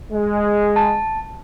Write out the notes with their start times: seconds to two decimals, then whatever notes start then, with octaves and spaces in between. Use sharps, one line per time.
0.12 G#3
0.76 A5